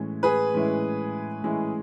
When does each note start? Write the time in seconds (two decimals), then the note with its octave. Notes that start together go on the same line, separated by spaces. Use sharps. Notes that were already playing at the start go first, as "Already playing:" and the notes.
Already playing: A2 E3 G#3 C#4 E4
0.23 G#4 B4
0.54 A2 E3 G#3 C#4 E4
1.42 A2 E3 G#3 C#4 E4